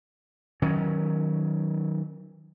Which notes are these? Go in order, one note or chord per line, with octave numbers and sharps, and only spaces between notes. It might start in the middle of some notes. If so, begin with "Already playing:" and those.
D#3 F#3 C#4